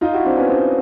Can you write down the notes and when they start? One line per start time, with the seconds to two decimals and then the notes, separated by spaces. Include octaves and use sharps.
0.01 D#4 F4
0.14 E4 F#4
0.25 C4 D4
0.38 B3 C#4
0.49 C4 D4